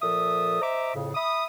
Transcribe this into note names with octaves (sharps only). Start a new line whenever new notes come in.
A#2 F3 A4 E5 D#6
C5 D#5 E5 A#5 D6
F2 A2 C#3
E5 B5 D#6